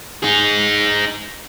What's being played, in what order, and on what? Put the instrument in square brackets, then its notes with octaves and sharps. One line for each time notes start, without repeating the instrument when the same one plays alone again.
[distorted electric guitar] D#4 G#4